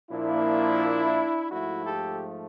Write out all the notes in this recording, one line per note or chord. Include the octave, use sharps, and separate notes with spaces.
A#2 F3 A#3 D4 E4
G#2 F3 A3 E4 F#4
G4 A4